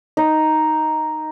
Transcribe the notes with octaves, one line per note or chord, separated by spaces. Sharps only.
D#4